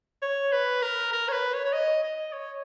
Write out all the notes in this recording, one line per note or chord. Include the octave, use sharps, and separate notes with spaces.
C#5
B4
A#4
A#4
C#5
B4
C#5
C#5
D#5
D#5
C#5